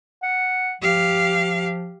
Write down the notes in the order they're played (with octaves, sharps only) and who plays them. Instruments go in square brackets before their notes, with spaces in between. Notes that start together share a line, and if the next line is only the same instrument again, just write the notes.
[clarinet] F#5
[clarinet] F3 [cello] G4 F5